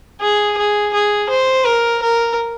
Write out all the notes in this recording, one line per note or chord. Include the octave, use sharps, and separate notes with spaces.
G#4
G#4
G#4
C5
A#4
A#4